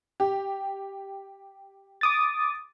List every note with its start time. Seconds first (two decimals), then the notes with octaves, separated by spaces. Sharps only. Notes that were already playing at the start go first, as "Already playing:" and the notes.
0.20 G4
2.01 D6 D#6 A6